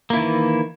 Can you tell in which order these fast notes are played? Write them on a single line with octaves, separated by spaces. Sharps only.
A#3 E4 D#3 E3